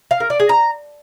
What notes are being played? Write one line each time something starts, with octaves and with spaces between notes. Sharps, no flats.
F5
A#4
D5
G#4
A#5